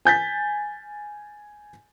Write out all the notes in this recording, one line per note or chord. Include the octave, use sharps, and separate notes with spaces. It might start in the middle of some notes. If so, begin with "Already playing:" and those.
G#5 G6 A6 B6